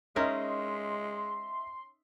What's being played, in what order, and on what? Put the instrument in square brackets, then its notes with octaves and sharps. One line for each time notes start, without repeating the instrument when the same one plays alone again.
[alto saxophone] G#3 [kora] C#4 D#4 A#4 [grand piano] D#5 E5 [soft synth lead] C6